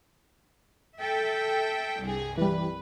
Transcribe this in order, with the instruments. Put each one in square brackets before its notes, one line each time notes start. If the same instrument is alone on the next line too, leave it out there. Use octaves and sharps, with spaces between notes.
[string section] A4 E5 G5
C2 G2 G#4
[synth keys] E3 G3 [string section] B4